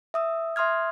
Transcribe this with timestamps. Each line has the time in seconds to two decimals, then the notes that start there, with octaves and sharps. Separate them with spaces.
0.14 E5 D#6 E6
0.56 E5 C6 D#6 F6 G#6